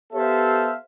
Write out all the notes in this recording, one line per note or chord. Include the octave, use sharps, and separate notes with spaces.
B3 G4 A4 C5 E5 F5